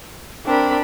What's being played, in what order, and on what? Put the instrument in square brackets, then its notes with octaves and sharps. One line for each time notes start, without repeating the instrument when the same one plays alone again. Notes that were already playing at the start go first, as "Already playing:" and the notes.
[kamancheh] C4 A#4 [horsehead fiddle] D4 B5